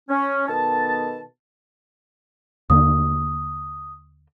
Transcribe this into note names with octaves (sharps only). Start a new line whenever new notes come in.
C#4
B2 D#3 B3 A4 A5
D#2 D3 A#3 D#6